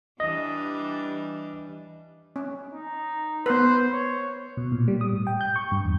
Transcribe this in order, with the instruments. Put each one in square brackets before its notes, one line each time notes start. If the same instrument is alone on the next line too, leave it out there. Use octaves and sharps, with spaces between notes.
[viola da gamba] E3 G3 D4 [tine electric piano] D#5
[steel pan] C#4
[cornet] D#4
[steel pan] B3 B4 [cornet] C5
[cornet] C#5
[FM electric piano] B2
A#2
G3
D#6
A2
G5
G6
C#6
G2
E2